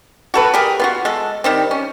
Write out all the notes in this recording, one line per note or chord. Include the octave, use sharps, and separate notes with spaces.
F#4 A4 B4
G4 G#4 A#4
B3 F4 F#4
G#3 A4
D#3 G3 C4
C#4